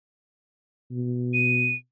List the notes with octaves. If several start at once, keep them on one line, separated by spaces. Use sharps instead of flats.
B2
D#7